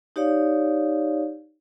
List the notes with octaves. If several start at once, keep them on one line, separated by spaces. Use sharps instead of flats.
D#4 G4 C#5 D5 F5